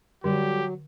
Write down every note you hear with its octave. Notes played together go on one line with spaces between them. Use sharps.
D3 F#3 G3 G4 A4 D5